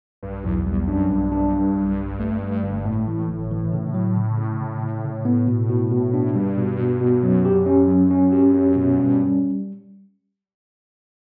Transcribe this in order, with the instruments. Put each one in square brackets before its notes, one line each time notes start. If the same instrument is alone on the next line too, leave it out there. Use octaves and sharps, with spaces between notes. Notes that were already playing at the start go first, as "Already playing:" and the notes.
[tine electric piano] B1 [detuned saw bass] G2
[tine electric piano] B1 [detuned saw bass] E2
[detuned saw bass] E2 [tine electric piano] G3
[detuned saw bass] F#2 [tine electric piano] D4
[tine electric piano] B1 [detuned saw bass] G2
[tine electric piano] D4
G3
B1
G1
A3
A3
G1
[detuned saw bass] A2 [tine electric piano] A3
[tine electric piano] E3
G1
E3
C#3
F#3
C#3
C#3
C#3
C#3
C#3
B3
B2
B2
B2
D4
[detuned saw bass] G2 [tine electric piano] G3
[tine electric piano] B2
B2
B2
[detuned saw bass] F#2 [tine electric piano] F#3
[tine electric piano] G4
C#4
F#3
C#4
G4
C#4
B2
[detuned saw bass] G2 [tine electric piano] C#4
[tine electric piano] G3